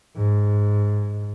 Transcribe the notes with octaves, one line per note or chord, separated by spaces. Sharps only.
G#2